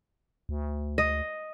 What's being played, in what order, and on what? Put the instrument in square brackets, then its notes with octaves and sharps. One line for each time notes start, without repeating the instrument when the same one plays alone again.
[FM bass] D2
[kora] D#5